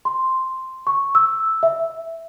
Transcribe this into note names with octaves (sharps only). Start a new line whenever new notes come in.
C6
C#6
E6
E5